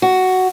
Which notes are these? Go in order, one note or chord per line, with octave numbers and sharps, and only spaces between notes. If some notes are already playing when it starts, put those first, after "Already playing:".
F#4